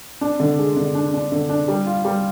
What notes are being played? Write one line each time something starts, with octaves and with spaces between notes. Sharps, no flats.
D4
D3
G#3
D3
D4
D4
D3
D4
G3
F4
G3